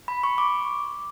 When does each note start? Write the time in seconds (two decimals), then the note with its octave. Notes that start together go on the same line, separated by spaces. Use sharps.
0.08 B5
0.23 C#6
0.38 D6